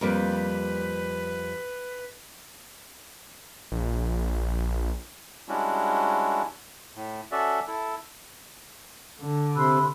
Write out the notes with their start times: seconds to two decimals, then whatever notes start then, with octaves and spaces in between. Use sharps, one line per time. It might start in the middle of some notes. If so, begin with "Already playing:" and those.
0.01 F2 G3 A#3 B4
3.72 A#1
5.49 G3 G#3 C#4 D4 E4 F#4
6.96 A2
7.32 C#4 F#4 A4 D5 E5
7.68 E4 A4
9.20 D3
9.56 C3 B5 C6 E6 F#6